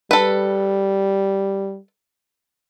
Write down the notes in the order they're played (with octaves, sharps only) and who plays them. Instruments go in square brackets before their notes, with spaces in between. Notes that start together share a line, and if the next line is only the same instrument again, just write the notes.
[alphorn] G3 [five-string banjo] A4 B4